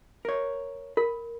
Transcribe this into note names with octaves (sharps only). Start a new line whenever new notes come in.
A#4 C#5
A#4 B5